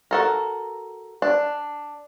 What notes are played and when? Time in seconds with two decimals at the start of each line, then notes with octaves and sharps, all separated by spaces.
0.11 F#4 A4 A#4
1.22 D4